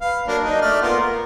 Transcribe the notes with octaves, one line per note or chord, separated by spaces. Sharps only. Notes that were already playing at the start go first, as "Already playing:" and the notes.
B4 F5
F#3 A#3 D4
D4 D#4
A3 D5 F6
A#3 B3 F4
A#4